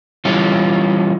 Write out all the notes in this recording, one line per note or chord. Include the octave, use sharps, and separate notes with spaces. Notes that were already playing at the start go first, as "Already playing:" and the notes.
E3 G3 C#4 F4